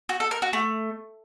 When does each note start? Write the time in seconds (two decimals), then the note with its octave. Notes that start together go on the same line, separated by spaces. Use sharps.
0.09 F#4
0.20 A4
0.31 A#4
0.42 F#4
0.53 A3